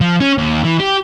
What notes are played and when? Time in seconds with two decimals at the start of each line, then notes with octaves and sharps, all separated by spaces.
0.01 F3
0.20 C#4
0.38 D#2
0.64 E3
0.79 G4